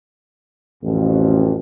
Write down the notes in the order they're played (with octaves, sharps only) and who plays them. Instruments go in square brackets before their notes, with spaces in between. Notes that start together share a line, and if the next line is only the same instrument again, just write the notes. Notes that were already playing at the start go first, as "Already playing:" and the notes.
[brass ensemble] A1 F2